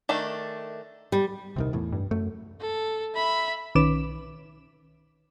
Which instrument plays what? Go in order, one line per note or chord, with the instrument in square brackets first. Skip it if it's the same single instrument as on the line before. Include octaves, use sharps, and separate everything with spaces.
[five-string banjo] D#3 A3 D4
[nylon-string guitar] G3
[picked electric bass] D#1 C2 D#3 [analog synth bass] C3
[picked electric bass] E2 A2
[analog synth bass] G2
[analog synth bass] F#2 [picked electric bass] A3
[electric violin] A4
E5 B5
[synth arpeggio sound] B1 D#3 C#4 B4 D6 E7